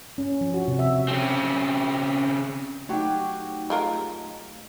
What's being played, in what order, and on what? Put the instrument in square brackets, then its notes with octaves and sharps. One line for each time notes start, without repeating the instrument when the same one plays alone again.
[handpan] C#4
F3
F#4
C3
E5
[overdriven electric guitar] C#3 C4
[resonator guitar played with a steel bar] F#3 F#4 G4 [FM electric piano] A3 D#4
[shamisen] G#3 F4 A#4